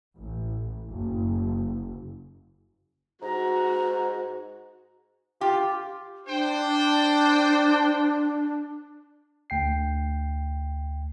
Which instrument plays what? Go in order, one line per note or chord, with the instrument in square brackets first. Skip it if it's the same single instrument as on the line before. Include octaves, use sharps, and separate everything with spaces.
[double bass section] A1
F#1
[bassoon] G#2 [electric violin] F#4 [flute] A#5
[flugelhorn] F4 [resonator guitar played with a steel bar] G4
[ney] D4 [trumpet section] C5 G5
[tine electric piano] D2 G5 C7